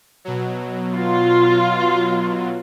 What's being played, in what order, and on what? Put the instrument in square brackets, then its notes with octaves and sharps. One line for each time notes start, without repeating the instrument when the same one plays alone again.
[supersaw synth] B2 F#3
[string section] F4